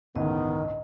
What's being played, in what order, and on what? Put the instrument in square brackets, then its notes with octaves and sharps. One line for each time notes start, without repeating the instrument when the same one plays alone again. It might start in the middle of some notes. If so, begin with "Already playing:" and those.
[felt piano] G1 C#2 A2 [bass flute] D#3 [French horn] B3 [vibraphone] D#5